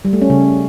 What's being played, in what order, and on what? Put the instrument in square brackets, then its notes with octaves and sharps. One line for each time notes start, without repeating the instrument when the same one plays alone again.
[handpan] G3
A3
C#4
C#3